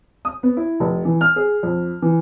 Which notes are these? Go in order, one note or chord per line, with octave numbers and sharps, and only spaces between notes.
D#6
B3
E4
F1
E3
F6
G#4
F2
E3